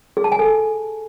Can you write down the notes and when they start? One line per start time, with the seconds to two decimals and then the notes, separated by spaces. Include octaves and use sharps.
0.17 G#4
0.24 A5
0.32 G#5
0.39 A4